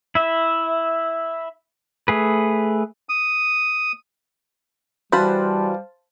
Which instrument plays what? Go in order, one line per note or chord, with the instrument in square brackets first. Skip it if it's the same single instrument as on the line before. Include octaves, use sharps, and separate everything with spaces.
[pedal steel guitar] E4 E5
A3 G#4 B4
[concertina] D#6
[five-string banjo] E3 F#4 B5 [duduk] G3 [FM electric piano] C5 F5 A5